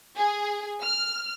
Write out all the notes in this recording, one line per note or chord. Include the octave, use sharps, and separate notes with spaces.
G#4
F6